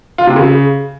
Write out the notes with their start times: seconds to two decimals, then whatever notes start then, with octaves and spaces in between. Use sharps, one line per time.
0.18 F4
0.27 C3
0.36 C#3